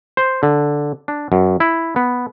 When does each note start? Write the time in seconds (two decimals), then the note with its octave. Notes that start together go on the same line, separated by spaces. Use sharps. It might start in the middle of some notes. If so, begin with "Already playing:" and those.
0.17 C5
0.43 D3
1.08 D4
1.32 F#2
1.60 E4
1.96 B3